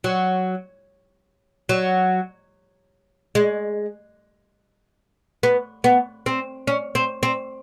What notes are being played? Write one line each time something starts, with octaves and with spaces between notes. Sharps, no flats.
F#3
F#3
G#3
B3
B3
C4
C#4
C4
C4